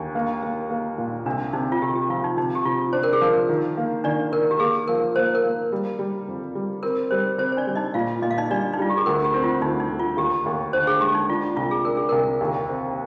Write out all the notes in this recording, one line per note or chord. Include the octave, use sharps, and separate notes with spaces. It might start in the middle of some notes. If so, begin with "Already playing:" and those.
Already playing: D#2 D4
A#3
A#3
A#3
A#2
C2 D4
C3 D#4
F4
C3 G4
G4
F3 F4
D#4
C3 D#4
G4
C3 F4
D4 C5
A#4
G#4
F3 A#4
D#3
A#3
D#3 D4 D5
D#3 A#4
G4
A#3 G#4
F3 A#4
A#3 C5
A#4
A#3
G3
G3
F2
G3
C4 A#4
G3 C5
C4 C5
C5
D4 D5
G3
D#4 D#5
A#2 F4 F5
A#2 D#5
F5
D#4 D#5
G3 D4 D5
D#4
G3 F4
G4
G#4
D2 A#4
G4
C4
F4
D2 D#4
D#4
D2
F4
D#2 G4
D#2
D3 C5
G#4
G#3 G4
D#4
D4 F4
F4
C2 F4
G#4
D4 A#4
G#4
C2 A#4
D#2
C4